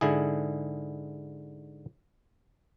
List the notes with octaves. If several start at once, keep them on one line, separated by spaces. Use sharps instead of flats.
G#2 D3 E4 G#4